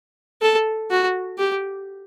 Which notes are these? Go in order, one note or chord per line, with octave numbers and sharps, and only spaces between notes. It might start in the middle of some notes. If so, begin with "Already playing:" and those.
A4
F#4
G4